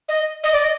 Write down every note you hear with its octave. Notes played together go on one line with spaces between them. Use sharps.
D#5
D#5
D5
D#5